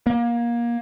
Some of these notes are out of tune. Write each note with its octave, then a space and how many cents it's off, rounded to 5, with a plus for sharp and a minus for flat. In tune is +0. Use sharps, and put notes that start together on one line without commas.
A#3 +25